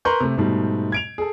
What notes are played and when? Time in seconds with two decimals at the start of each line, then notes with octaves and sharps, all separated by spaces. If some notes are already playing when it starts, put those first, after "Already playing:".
0.05 A#4 B4 A#5 C6 C#6 G6
0.20 C3 A3
0.37 G#2 B2 G3 A3
0.92 G#6 D7 F7
1.18 G#4 A4